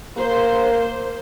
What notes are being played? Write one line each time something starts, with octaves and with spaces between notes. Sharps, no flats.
A#3 C5